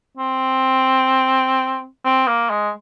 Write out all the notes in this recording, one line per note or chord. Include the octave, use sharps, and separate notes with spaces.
C4
C4
A#3
G#3